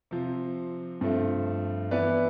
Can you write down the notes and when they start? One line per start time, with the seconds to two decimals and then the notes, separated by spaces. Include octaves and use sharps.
0.11 C3 F3 C4
1.01 G2 F3 A3 C4
1.91 E3 B3 E4 B4 D5